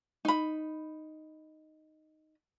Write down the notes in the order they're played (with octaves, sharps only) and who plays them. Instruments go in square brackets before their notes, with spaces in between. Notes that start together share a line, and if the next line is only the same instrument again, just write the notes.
[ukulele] D#4 B5